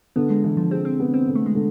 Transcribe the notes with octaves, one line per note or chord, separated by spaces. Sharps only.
D3 B3
G#3
D3 E3
F3
G#3 C4
C4
B3
C4
D3
A3
G#3
D3